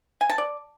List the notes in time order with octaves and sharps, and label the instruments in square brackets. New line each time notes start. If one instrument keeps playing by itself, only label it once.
[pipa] G#5
A5
D5